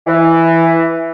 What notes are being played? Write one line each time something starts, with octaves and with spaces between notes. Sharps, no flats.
E3